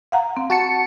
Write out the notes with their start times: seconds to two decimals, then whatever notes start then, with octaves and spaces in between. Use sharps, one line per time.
0.12 F5 F#5 A#5
0.37 C4
0.50 F#4 A5 C#7